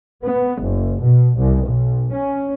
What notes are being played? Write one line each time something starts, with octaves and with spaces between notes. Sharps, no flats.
B3
F#1
B2
C2
B1
C#4